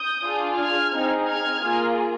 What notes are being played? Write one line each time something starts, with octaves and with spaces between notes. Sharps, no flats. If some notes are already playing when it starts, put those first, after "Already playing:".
Already playing: D#6 G6
D4 F4 G#4
F6 G#6
C4 D#4 G#4
F6 G#6
A#3 F4 G#4